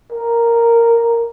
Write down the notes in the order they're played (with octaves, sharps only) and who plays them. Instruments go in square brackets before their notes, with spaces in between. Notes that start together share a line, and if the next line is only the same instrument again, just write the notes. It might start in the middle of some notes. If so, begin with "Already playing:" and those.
[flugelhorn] A#4